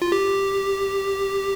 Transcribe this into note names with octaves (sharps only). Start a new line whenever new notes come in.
F4
G4